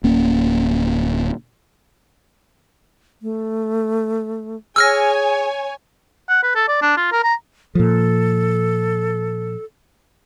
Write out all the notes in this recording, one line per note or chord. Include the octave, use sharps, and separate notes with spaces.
D1 A#3 C#4
A3
G#4 C#5 G#5 E6 F6 A#6
F#5
B4
A4
D5
D4
F4
A#4
A#5
A#2 F3 A4